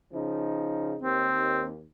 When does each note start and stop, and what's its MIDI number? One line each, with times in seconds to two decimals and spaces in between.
0.13 0.96 49
0.13 0.96 53
0.13 0.96 63
1.02 1.83 39
1.02 1.67 60